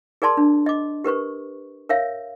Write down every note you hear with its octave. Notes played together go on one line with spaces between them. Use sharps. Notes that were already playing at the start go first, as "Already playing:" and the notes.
G#4 A#4 D5 A5 C6
D4
D#5 D6
G4 A#4 B4 C#6
A#4 C#5 E5 F5